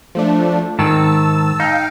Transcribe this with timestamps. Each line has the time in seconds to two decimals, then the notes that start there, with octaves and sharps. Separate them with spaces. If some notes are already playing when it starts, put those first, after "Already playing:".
0.15 F3 A3 D4
0.79 G#2 D#3 A5 E6
1.60 D#4 F5 G5